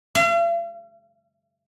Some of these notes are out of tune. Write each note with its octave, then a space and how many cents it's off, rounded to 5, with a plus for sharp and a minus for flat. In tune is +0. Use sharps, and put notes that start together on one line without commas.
F5 -45